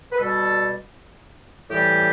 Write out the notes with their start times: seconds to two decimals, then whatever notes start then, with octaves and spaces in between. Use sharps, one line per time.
0.12 B4
0.19 B2 G3 A4
1.69 A2 E3 G3 G4